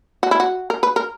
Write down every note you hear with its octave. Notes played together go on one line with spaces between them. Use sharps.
F#4
E4
F#4
A#4
B4
A#4